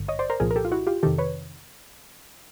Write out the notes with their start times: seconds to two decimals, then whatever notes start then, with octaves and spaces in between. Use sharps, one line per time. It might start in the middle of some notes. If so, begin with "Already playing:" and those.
Already playing: G#1 G2 D3
0.08 C#5 D#5
0.19 C5 D5
0.30 A#4 C5
0.40 C2 A#2 F3 G#4 A#4
0.51 A#4
0.56 G4 A4
0.65 F4
0.71 E4 F#4
0.87 F4 G4
1.03 F2 C3 D#3 G4 A4
1.18 B4 C#5